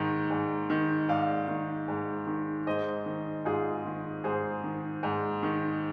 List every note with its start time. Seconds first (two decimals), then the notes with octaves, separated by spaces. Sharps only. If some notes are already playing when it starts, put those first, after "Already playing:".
Already playing: G#2 D#3
0.30 G#2
0.70 D#3
1.09 G#2 D5 F5
1.48 D#3
1.88 G#2
2.27 D#3
2.67 G#2 C5 D#5
3.06 D#3
3.45 G#2 F4 G#4
3.85 D#3
4.24 G#2 G#4 C5
4.64 D#3
5.03 G#2
5.43 D#3